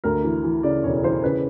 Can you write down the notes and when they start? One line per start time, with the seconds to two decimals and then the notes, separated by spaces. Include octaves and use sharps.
0.04 D2 A#4
0.24 E3
0.44 E3
0.63 C#3 D5
0.84 E1 C#5
1.04 E3 C5
1.23 C#3 B4